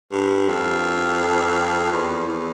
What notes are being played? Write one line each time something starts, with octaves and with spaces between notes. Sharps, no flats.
G2
F2
E2
E2